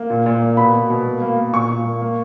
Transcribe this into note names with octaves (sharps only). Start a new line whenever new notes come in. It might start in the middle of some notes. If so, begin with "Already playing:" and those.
Already playing: A#3
A#2
A#2
A#3
B2 B5
B2
B2
A#3
A#3
A#3
A#2 C#6
A#2
A#3
A#3